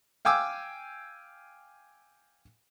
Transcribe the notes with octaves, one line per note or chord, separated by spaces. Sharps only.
F5 G5 G#5 D6 E6